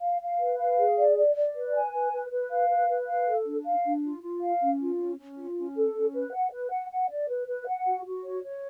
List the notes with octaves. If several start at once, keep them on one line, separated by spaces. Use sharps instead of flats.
F5
F5
B4
F5
G#4
D5
D5
D5
B4
G#5
B4
B4
B4
F5
B4
B4
F5
A4
D4
F5
D4
F4
F4
F5
C#4
F4
C#4
C#4
F4
C#4
A4
C#4
B4
F#5
B4
F#5
F#5
D5
B4
B4
F#5
F#4
F#4
C#5
C#5